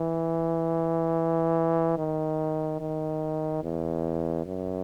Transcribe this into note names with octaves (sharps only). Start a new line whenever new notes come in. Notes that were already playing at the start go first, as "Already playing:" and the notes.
Already playing: E3
D#3
D#3
E2
F#2